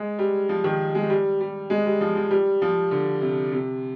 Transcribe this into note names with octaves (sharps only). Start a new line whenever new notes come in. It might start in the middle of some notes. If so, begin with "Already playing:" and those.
Already playing: G#3
G3
F3
D#3
G#3
G3
G3
G#3
G3
F3
F3
G3
F3
D3
C3
C3